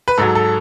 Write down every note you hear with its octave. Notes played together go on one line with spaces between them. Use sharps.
B4
G#2 F#3 A4
A4